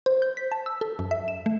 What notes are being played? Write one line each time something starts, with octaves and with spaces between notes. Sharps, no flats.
C5
G6
B6
A5
E6
A4
F#2
E5
E7
A3